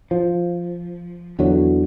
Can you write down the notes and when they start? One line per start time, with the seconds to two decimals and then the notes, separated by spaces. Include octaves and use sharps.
0.11 F3
1.39 E2 D3 E3 F#3